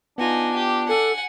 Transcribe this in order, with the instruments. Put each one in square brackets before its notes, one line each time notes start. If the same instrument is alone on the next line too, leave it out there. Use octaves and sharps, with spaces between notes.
[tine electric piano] B3 F4 [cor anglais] D4 [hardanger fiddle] D#4 G#5
[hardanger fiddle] G4
[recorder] A4 [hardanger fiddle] F#5 G#5